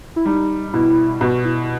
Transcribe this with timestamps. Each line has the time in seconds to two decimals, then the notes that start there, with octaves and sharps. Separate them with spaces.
0.16 E4
0.25 G3 D#4
0.74 B2 E4
1.21 B2 F#4
1.45 E4